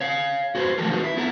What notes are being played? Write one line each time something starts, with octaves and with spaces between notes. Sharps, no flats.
C#5 F5
F#4 G#4 B4 C5
E3 F3 A3 G4 A4 A#4
D#4 F#4 G#4 B4
E4
B3 E4 A4 E5 F#5 A#5